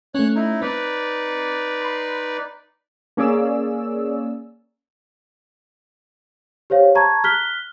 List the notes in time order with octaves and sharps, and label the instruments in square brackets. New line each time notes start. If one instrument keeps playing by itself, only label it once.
[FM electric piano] A3 C#4 [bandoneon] C#5 F#6
[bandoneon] D#4 E4
[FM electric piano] C4 [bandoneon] D#4 B4 D5
[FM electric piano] B5 C6
[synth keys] A#3 C#4 G#4 D5 E6
[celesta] G4 C5 C#5 F5
A5 A#5 C#6 G#6
F6 F#6 B6 G7